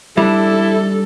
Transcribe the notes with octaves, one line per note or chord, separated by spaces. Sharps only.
G3 D4 E4 A4